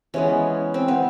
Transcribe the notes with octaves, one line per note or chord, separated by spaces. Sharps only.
E3 G#3 B3 C#4
C4
B3